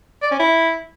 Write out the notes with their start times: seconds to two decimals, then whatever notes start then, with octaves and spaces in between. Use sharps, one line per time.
0.22 D5
0.31 C#4
0.40 E4